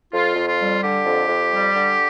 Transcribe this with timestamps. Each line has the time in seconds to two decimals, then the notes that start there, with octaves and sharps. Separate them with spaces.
0.12 F2 F4
0.36 F2
0.47 F4
0.59 G3
0.82 D3 G4
1.06 F2
1.29 F2
1.52 G3
1.75 D3